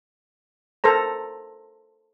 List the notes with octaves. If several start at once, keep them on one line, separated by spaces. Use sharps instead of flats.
A4 A#4 C5 A#5